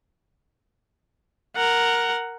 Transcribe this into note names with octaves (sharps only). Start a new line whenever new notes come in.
A#4 F#5